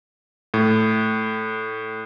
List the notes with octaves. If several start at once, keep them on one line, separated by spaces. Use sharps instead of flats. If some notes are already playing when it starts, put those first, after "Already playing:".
A2